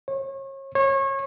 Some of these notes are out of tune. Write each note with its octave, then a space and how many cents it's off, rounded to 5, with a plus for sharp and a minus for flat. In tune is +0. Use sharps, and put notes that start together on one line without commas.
C#5 -35
C#5 -30